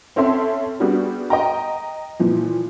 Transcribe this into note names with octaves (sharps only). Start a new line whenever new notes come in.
C4 C#4 A4 E5 C6
G3 B3 D4 F#4 G#4
D#5 G5 A#5
A#2 E3 F3